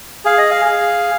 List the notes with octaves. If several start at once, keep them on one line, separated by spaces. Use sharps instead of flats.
G#4 F5
D#5
F5
G#4